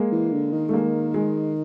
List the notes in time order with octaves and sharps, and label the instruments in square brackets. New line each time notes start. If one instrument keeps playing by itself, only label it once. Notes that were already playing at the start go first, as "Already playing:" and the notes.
Already playing: [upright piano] G#3 A#3
[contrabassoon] E3
D3
D#3
[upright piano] A3
G#3 A#3
G#3